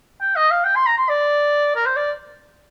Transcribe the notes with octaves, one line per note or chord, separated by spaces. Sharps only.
G5
D#5
F5
G5
C6
A#5
C6
D5
A#4
C5
D5